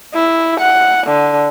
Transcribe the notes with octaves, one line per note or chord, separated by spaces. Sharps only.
E4
F#5
D3